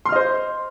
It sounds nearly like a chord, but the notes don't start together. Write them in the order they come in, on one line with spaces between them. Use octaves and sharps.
C6 F6 D#5 C5